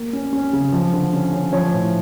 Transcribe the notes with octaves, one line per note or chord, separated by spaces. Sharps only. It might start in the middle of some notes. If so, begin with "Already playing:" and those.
Already playing: A#3
C#4
C#4
C#3
F3
D3
C#4
C#4
F3 C#5
A2